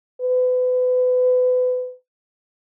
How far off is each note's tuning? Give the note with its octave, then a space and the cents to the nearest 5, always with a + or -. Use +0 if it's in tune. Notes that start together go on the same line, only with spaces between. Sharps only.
B4 +30